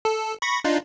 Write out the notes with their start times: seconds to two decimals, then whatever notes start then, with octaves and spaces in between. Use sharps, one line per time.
0.05 A4
0.42 B5 C#6 A#6
0.64 D4 D#4 F4